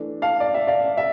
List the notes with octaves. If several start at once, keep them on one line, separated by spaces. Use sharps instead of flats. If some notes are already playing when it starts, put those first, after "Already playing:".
Already playing: E3 A3 D4
F5 A5
D5
E5
D5 F5
E5